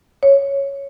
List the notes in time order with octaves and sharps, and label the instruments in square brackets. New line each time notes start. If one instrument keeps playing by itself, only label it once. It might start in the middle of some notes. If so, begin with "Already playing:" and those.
[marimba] C#5